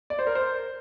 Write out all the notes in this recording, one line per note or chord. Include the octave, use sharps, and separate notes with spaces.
D5
C5
A#4
C5